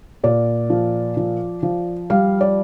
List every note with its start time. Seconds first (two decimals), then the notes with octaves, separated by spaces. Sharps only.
0.24 A#2 D5
0.70 F3
1.17 F3
1.63 F3
2.10 G3 F5
2.41 D5